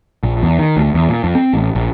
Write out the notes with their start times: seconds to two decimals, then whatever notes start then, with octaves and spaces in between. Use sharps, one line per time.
0.23 A#1
0.43 E2
0.59 D#3
0.77 D2
0.94 E2
1.09 A#2
1.24 F2
1.35 C4
1.53 A1
1.75 A#1